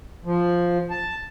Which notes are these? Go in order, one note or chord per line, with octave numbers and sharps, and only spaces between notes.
F3
A5